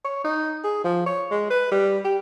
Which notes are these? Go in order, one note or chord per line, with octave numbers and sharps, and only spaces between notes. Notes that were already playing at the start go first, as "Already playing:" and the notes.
C#5
D#4
G#4
F3
C#5
G#3
B4
G3
G4